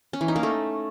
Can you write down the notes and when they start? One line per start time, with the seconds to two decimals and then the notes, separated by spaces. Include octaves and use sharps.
0.13 C#4
0.21 E3
0.28 D#4
0.36 A#3
0.43 A3